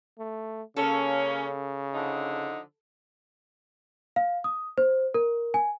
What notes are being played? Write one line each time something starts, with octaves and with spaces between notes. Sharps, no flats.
A3
C#3 A#3 C#4 A4
D3 F3 D#4
F5
D#6
C5
A#4
G#5